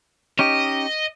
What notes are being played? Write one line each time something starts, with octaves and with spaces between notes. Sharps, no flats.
C#4 D#4 G4 D#5